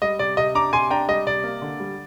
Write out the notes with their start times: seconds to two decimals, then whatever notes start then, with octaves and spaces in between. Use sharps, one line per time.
0.02 G3 D#5
0.19 C3 D5
0.37 C3 D#5
0.55 D4 A#5 D6
0.73 C3 G#5 C6
0.90 D4 G5 A#5
1.08 G3 D#5
1.26 C3 D5
1.44 A#3
1.62 D3
1.80 G3